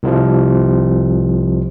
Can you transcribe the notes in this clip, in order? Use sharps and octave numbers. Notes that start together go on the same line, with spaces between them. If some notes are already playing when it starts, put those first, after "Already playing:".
C2 C3 F3